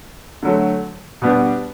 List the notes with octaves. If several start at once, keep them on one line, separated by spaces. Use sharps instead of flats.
D3 F#3 A3
B2 G3 B3 D4 G4